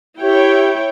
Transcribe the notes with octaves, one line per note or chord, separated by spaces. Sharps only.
E4 G4 C#5 G5